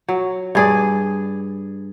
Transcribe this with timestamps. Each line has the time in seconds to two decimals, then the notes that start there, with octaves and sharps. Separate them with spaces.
0.08 F#3
0.55 G2 G#4 D5